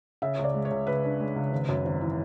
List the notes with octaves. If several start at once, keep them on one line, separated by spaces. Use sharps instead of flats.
C#3 E5
C#2 C#5
D5
G#3
C#5
C#2
C#2 B4
D4
G#3
C#2
G#1
F#2
G#1
E3